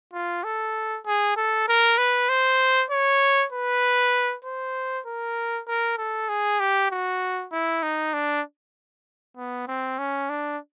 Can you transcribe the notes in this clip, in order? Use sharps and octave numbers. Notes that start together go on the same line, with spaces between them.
F4
A4
G#4
A4
A#4
B4
C5
C#5
B4
C5
A#4
A#4
A4
G#4
G4
F#4
E4
D#4
D4
B3
C4
C#4
D4